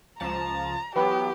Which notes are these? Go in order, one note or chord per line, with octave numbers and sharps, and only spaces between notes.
C#2 F3 A5 A#5
E3 F#3 B3 G4 B4 G5 B5